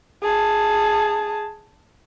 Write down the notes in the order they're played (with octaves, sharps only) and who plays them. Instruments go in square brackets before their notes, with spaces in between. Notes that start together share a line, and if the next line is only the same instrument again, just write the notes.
[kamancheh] G#4 A5